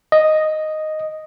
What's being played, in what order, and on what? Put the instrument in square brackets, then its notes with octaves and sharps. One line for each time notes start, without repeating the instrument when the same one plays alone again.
[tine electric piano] D#5